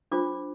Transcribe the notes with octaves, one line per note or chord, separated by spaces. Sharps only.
D4 F4 C5 D6